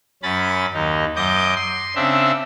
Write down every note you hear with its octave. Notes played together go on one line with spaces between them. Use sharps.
F#2 C#4 B5 A6
D#2 D#4
F#2 D#5 D6 D#6 G6
C6
C#3 C4 D4 E5